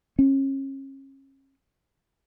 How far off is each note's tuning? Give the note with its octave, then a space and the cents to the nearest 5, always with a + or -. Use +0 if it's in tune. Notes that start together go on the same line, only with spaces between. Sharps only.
C#4 -35